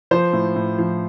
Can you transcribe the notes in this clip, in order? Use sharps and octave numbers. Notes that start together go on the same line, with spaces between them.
F3 C5
A2
A2
F3